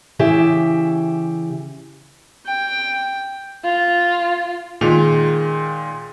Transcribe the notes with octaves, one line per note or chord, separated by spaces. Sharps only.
C#3 E3 G4 E5
G5
F4
A#2 D#3 G#3 F7